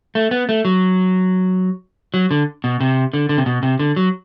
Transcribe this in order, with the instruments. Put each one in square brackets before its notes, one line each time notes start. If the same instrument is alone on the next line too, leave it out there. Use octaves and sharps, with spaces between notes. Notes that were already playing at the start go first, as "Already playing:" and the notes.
[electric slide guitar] A3
B3
A3
F#3
F#3
D3
B2
C3
D3
D3
C3
B2
C3
D3
F#3